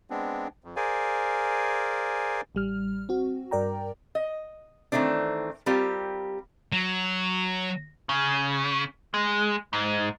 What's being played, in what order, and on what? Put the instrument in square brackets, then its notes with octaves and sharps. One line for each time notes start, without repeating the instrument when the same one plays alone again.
[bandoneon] G#3 B3 C4 D4
F2
G#4 A#4 C5 D5 F5 G#5
[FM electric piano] A1 G3 F6
C4 F#4
G2 A#4 D5 G5 A#5
[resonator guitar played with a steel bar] D#5
D#3 E3 A3 C4 D4
G3 C4 F4 G4 A#4
[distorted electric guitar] F#3
[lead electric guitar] C#3
G#3
G#2